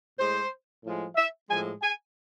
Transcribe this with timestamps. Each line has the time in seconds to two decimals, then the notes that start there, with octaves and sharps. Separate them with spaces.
0.18 A2 G#3 C5
0.83 A2 F3 G#3
1.16 E5
1.48 A2 F3 G#3 G#5
1.82 G#5